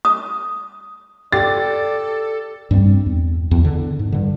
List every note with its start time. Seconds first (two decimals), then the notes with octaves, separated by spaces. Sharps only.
0.05 D#6
1.32 G4 A4 D5 A6
2.71 G2 G3 A3 C4
3.06 E2
3.51 E2
3.65 D3
3.99 G#2
4.12 G2 D3